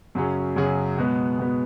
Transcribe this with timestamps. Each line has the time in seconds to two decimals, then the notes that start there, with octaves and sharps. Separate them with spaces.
0.15 F#2 C#3 F#3 C#4 G#4
0.56 F#2 C#3 F#3 C#4 G#4
0.98 B2 G#3 B3
1.39 B2 G#3 B3